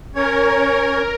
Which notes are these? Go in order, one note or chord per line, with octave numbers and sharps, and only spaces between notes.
C#4 A#4 C#5